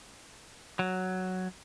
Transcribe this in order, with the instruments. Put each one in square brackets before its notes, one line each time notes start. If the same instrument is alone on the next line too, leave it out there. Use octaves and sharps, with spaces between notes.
[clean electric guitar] F#3